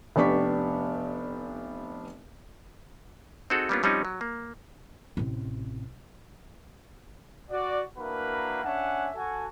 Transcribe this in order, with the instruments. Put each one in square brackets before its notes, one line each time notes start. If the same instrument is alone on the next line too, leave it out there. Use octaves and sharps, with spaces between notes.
[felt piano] F1 B3 D4 G4 C#6 B6
[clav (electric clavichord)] C4 D#4 F#4 G#4 A4
G3 A#3 B3 C#4 D4 F4
F3 G3 C4 C#4 D#4
F#3
A#3
[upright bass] A1 C3
[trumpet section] F#4 D5
A#3 D4 E4 F#4 A#4 B4
C#4 D4 E5 F#5 G#5 A5
F#4 A4 G#5